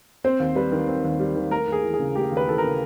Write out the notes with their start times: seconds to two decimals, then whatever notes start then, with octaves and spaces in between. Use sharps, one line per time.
0.24 C4 C5
0.40 D#2
0.55 G3 B4
0.72 D#3
0.88 C4
1.04 D#2
1.20 G3
1.36 D#3
1.51 A3 A#4
1.67 D#2
1.72 G#4
1.84 E3
1.94 G#4
1.99 C#3
2.15 A3 G4
2.32 D#2
2.37 B4
2.48 E3 A4
2.58 A#4
2.63 C#3